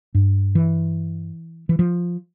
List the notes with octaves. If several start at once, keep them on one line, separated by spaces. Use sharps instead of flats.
G2
E3
E3
F3